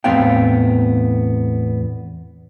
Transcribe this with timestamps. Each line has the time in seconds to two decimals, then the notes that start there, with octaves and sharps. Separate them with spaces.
0.04 E2 A2 B3 C4 F5 G5